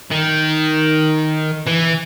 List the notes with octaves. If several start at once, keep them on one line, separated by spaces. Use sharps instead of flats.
D#3
E3